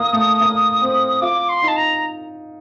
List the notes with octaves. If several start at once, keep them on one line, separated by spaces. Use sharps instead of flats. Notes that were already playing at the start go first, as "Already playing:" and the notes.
Already playing: A#3 D#6
A3
A#3
C4
F4 D6
C6
D#4
A5
A#5